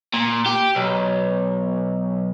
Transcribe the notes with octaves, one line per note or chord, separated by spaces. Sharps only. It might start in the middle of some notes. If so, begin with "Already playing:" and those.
A#2
G4
B1